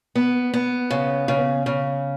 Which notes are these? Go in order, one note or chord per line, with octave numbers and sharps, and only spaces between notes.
B3
B3
C#3
C#3
C#3